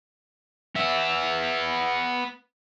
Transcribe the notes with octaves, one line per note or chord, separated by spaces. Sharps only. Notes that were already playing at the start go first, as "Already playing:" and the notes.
B3 E5